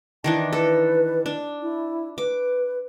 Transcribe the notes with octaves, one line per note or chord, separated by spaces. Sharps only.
D#3 E3 D4 A5
A4 B4
D4
E4
B4 D6